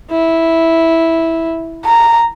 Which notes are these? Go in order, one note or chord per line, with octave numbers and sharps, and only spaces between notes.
E4
A#5